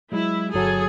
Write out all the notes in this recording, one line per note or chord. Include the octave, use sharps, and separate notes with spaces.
F#3 G#3 E4
G1 F#3 F#4 G#4 A4